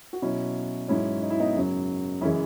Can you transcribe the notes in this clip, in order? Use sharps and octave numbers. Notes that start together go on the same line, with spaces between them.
F#4
B2 F#3 C#4 E4
G#2 F#3 C#4 E4
D#4
E4
B3 D#4
F#2 C#3 F#3
F#2 C#3 E3 G#3 C#4 E4